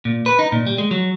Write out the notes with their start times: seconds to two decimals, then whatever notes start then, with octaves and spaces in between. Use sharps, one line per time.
0.05 A#2
0.26 B4
0.39 D#4
0.52 A#2
0.67 G3
0.78 G#3
0.91 F#3